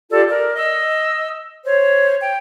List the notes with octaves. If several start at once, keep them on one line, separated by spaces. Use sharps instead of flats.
F4 G4 A4 D5
A#4 D5
D#5 E6
C5 C#5
G5